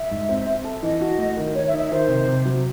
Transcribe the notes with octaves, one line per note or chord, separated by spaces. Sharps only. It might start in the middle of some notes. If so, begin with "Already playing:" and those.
Already playing: E5
G#2
C4
C4
A4
E3 D#5
F#4
A3
D#3
D#3 C#5
E5
D#4
E5
D#3 C5
C3
C3
F#3